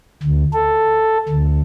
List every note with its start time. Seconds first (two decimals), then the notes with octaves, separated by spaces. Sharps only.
0.23 D2
0.53 A4
1.29 D2